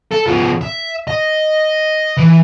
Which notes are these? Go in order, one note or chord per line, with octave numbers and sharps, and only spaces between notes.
A4
F3 B3
E5
D#5
E3